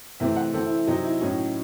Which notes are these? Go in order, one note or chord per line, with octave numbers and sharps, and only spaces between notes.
C3 E3 A3 C4 E5
F#5
E3 C4 A4
E4
E4
C3 F#3 C4 D#4
E4
A2 F#3 C#4 D#4